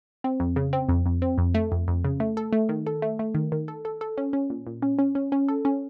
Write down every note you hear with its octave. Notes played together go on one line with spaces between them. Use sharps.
C4
F2
C#3
C4
F2
F2
C4
F2
A3
F2
F2
C#3
A3
A4
A3
D#3
A4
A3
A3
D#3
D#3
A4
A4
A4
C#4
C#4
A#2
A#2
C#4
C#4
C#4
C#4
A4
C#4